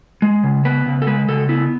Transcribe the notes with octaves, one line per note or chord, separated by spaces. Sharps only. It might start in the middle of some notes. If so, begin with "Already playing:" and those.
G#3
C#3
B3 B4
C#3
A4
G#3 B4
C#3 A4
B3 E4